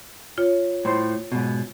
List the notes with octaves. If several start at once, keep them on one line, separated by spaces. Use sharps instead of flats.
F4 C#5
A2 C5
G#2 B2